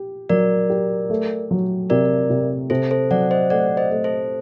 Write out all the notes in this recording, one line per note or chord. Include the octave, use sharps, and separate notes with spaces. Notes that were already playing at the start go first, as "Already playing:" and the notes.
Already playing: G4
F#3 A#4 D5
G4
A3
F#3
C3 A#4 D5
C3
C3 A4 C5
A4 C5
F#3 D5 F#5
C5 D#5
A3 D5 F#5
C5 D#5
A3
A4 C5